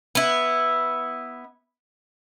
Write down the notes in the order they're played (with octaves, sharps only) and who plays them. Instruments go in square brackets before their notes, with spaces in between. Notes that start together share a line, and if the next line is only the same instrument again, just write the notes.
[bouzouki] B3 E4